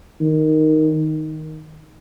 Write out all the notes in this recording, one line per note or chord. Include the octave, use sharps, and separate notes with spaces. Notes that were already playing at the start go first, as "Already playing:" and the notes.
D#3